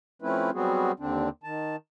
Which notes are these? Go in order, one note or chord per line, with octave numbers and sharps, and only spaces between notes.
F3 A3 C4 C#4 E4 B4
F#3 G3 B3 C4 F#4 G#4
D#2 D3 C4 D4
D#3 A5